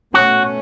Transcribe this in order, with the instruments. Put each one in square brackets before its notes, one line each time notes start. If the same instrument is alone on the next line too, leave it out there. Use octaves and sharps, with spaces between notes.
[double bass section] B2 A3 C#4 [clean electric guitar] F#4